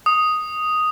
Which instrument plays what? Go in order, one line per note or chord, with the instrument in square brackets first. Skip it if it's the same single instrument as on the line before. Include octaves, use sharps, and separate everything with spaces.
[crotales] D#6